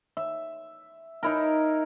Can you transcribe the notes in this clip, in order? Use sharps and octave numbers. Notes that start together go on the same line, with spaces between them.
E5
D#4 E4 A#4